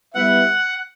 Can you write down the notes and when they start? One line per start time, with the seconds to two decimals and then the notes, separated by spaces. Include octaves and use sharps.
0.15 G3 B3 E4 B4 E5 F#5